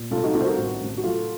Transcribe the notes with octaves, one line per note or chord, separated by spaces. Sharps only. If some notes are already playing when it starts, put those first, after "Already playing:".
Already playing: A#2
C2 F4 A4
D#4 F#4
C2 F4 A4
C5
F#4 A#4
A1
A1
F#4
F#3 F4 A4